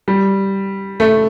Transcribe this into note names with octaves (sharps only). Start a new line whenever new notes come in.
G3
A3